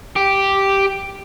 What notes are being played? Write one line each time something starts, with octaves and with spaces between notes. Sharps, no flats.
G4